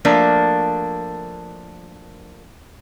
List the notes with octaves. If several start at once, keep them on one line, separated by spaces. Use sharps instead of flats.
F3 A3 A#3 D4